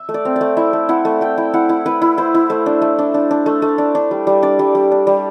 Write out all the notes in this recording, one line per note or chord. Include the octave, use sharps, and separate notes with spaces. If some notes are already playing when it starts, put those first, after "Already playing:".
Already playing: E5
A3
D5
C4
D5
A3
E4 E5
A3
E4 F#5
A3
A3 G5
E4
E4 F#5
E4
E4 B4
E4
E4 C5
E4
A3 C5
D4
A3
D4
D4
D4
A3
A3
D4
D4
G3
G3
D4 D5
G3
G3
D4
G3